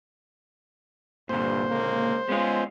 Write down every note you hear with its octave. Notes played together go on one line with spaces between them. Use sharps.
C2 G2 A#2 D3 C5
C#3 G#3 A#3
G#3 B3 C#4 F4